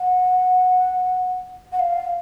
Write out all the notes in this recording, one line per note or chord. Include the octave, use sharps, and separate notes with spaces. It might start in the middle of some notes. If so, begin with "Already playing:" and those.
Already playing: F#5
F#5
F5